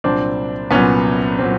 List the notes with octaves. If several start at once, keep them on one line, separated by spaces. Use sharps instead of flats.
C2 A#2 F#3 C4 D4
C2 A#2 F#3 B3 C#4
A#2 F#3 C4